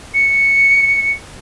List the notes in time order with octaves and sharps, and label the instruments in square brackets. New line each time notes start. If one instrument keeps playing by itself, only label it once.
[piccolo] C#7